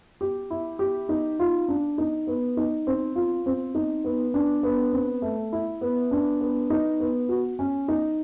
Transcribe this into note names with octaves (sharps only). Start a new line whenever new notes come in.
G4
E4
G4
D#4
F4
D4
D#4
B3
D#4
C4
F4
C4
D#4
B3
D4
B3
C4
A3
E4
B3
D4
B3
D#4
B3
F#4
C#4
D#4